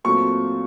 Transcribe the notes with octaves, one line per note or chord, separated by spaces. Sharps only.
A#2 F#3 A3 C4 C#6